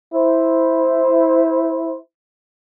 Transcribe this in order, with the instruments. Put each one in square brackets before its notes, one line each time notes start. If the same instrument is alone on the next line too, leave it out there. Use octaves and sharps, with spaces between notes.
[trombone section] E4 C5